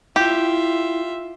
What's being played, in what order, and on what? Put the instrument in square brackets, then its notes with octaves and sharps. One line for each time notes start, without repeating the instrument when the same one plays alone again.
[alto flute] E4 [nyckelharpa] F4 E5 [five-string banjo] G4